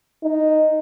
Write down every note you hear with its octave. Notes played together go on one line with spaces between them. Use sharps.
D#4